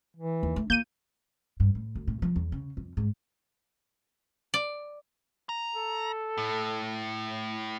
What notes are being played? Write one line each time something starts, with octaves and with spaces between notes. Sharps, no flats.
E3
D#2
A3
A#3 F4 G6 D#7
G2
A2
D2
A2
F3
E2
C#3
F2
G#2
D5
A#5
A4
A2